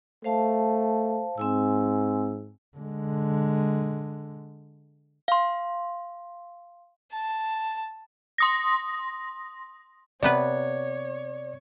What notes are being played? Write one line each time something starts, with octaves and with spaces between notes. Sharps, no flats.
A3 C5 F5 A5
G#2 C4 G#5 E6
D3 G#3
F5 C6
A5
C6 D#6 A#6
C3 B3 B4 C#5 D5